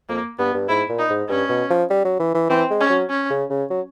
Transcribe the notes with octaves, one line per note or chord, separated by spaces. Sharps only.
F2 A#3
G2 B3
G2
G#2 E4
A#2
D#4
G#2
G2 C#4
B2
F3
G3
F#3
E3
E3
E3 C4
G#3
C#4
F#3
C#4
C#3
C#3
F#3